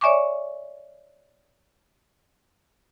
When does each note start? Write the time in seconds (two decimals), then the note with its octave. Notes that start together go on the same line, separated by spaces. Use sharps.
0.01 C#5 D5 E5 G#5 C#6 D6